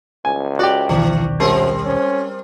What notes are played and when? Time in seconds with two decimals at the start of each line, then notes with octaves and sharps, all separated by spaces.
0.25 C#2 G#5
0.59 F#4 G4 D5
0.89 D#1 B1 D#3 E3
1.40 F#2 G3 C4 A#4
1.85 C#4